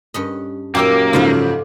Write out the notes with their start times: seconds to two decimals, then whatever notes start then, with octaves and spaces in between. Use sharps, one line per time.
0.14 G2 C#4 D#5
0.75 F#2 A#2 A#3 D#4 G4 G5 D6 E6
1.13 G#2 C#3 F3 F4 A4 E5